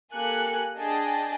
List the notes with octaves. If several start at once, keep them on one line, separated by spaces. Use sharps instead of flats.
A#3 G4 A4 G#5 F#6 C#7
D4 G#4 D#5 G5 A5